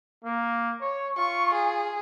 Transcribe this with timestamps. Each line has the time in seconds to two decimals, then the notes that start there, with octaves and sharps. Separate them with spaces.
0.24 A#3
0.81 C#5
1.18 F4 C#6
1.54 G#4